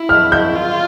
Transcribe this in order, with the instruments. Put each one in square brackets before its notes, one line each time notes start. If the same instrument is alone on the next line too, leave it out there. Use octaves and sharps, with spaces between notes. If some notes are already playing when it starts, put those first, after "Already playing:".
Already playing: [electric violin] E4
[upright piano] F6
G6
[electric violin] F4